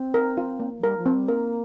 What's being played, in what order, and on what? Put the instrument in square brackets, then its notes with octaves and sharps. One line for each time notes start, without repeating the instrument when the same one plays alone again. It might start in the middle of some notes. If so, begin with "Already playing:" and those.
Already playing: [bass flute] C4
[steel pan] A#4
F4
A#3
[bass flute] F3
[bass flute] G3 [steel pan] A#4
[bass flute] F3
[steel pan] C4
[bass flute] G3
[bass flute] A#3 [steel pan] A#4